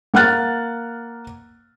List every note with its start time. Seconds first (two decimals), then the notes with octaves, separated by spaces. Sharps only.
0.14 A#3 F#5 F6 F#6 A6